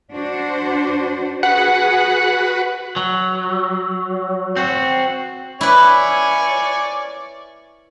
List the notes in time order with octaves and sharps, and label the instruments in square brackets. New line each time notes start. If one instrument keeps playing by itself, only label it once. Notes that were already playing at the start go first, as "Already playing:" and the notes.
[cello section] D4 F#4 C5
[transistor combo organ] F#4 B4 [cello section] G#4 [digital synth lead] F#5
[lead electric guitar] F#3
C4 F#4
[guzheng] E4 B4 [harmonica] C#5 D5 G#5